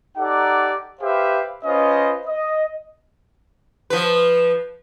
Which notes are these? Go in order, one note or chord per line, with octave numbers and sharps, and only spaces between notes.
D#4 G4 A4 D5 F#5 A#5
G4 B4 C5 E5 F5
C#4 F4 B4 C5 D#5
D#5
F3 B4